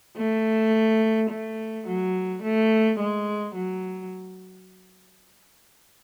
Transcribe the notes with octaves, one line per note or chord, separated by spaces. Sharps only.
A3
A3
F#3
A3
G#3
F#3